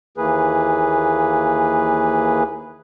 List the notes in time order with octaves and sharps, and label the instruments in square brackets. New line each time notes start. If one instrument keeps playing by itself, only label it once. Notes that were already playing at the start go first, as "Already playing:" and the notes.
[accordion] D#2 E3 A#3 G#4 B4